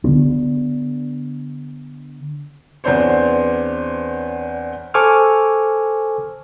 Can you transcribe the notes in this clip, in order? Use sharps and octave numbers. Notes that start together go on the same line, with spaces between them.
D3 F3 B3 D4
E2 B3 C4 D4 C5 C#5
A4 C5 G#5 C#6 D6 F6